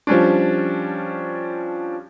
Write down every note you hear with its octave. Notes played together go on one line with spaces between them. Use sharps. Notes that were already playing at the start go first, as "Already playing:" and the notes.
F3 G3 C#4 D4